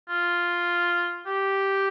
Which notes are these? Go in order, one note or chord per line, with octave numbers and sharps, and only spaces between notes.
F4
G4